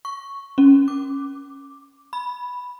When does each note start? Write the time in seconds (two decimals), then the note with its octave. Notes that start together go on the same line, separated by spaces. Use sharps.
0.05 C#6
0.58 C#4
0.88 D6
2.13 B5